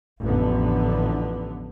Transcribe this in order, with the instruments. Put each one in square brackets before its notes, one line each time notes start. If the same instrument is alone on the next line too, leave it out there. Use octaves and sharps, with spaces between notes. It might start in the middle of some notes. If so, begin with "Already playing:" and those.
[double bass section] A1 F2 D3 B3